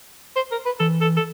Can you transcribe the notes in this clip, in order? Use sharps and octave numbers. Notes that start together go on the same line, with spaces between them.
C5
A#4
B4
E3 A4
A4
A4